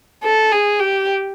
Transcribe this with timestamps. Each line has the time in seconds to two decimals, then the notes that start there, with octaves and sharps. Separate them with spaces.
0.24 A4
0.51 G#4
0.79 G4